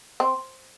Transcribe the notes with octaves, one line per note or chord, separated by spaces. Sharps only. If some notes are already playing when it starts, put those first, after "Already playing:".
C4